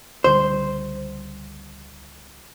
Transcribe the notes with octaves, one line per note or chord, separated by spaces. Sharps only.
C#2 D3 G3 C5